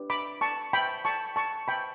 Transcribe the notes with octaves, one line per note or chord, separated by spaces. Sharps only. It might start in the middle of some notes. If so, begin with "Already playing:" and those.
Already playing: D4 G4 B4
B5 D6
A5 C#6
G5 B5
A5 C#6
A5 C#6
G5 B5